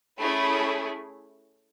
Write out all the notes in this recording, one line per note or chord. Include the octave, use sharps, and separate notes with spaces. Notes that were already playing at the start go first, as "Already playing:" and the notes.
A3 C#4 E4 G#4 B5